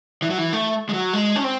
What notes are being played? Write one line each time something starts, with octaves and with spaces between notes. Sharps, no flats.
E3
F#3
E3
A3
G#3
F#3
G#3
C#4
C4